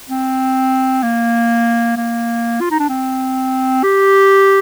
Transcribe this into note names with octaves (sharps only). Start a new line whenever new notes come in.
C4
A#3
A#3
F4
D#4
D4
C4
G4